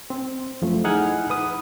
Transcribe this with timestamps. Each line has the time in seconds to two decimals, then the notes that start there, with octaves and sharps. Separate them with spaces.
0.10 C4
0.62 F#2 F3 A3
0.84 D#4 E4 G#4 F#5 G#5 F6
1.30 B4 D#6